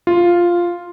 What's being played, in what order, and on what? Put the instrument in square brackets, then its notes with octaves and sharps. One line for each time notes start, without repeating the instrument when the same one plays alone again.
[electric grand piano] F4